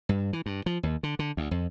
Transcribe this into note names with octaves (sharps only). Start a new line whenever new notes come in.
G2
E3
G2
F3
D#2
D3
D3
D2
F2